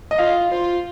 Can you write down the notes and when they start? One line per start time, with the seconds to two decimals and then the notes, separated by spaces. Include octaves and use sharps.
0.11 D#5
0.18 F4 F5
0.51 F4 C5